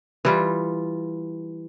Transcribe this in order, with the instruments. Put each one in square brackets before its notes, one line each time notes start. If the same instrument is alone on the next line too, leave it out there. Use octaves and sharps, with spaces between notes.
[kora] E3 G3 F4